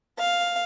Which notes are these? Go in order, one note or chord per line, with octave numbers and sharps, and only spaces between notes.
F5